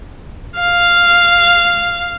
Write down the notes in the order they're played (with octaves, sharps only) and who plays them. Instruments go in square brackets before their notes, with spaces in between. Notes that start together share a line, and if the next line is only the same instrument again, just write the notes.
[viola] F5